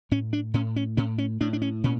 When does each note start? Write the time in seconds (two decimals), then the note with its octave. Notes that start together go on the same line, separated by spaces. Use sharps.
0.11 A2 C#4
0.33 D4
0.54 A2 C#4
0.76 C#4
0.97 A2 C#4
1.18 C#4
1.41 A2 D4
1.53 D4
1.62 C#4
1.84 A#2 C#4